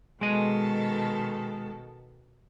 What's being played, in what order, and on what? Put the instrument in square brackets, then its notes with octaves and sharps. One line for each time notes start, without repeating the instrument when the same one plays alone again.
[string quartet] B2 D#3 A4 [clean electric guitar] G#3 D#5